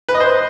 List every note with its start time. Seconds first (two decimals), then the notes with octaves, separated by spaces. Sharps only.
0.09 B4
0.14 D#5
0.20 C5